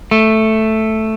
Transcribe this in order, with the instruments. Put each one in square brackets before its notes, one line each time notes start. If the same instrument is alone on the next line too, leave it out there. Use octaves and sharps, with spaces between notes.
[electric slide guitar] A3